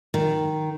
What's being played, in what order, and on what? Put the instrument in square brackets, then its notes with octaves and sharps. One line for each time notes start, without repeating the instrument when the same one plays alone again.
[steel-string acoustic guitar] D#3